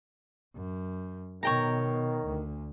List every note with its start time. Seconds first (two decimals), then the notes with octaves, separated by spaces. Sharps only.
0.55 F#2
1.43 B2 D#3 C#5 G5 A#5
2.26 D2